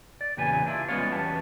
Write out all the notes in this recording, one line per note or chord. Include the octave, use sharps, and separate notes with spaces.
D5
E2 A#2 C#3 G4 B4 G#5
D4 E4 F4
G3 G#3 B3 C#4 F4 C#5
E2 F#3 C#4 G4 A5